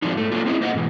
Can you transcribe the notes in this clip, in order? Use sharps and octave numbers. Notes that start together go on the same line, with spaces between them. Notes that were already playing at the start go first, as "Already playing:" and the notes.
F3 F#3 G#3 C4 D4 D#4
G#2 A3
F#3 A3 A#3 D4 F4
C4 C#4 D#4 E4 G#4
A#3 C5 D#5 F5 F#5
G#2 B2 E3